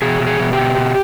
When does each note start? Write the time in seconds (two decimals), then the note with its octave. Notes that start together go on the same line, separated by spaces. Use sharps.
0.02 B2 G#4
0.20 B2
0.27 G#4
0.39 B2
0.53 G4
0.59 B2
0.78 B2